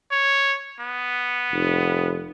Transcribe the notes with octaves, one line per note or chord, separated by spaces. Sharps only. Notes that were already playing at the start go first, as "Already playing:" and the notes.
C#5
B3
F1